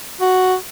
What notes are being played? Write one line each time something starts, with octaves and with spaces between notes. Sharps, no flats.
F#4